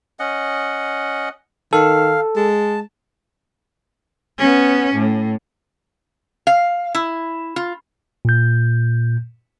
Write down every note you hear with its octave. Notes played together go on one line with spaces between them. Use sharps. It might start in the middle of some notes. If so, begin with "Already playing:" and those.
C#4 D#5 F#5
D#3 A4 F5
G#3 A5
B3 C#4
A2
F5
E4
F4
A#2 G6